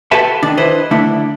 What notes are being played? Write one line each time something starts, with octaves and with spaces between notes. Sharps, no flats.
F#4 G4 A4 B4 E5 A5
D#3 D4
E4 B4 C5 D#5
D3 A3 D4 E4